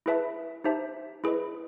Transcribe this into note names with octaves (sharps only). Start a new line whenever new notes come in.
E4 G#4 B4 E5 A5
D#4 G4 C5 E5 A5
E4 G#4 B4 D#5